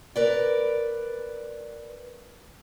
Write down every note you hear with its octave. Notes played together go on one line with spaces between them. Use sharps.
A#4 B4 D5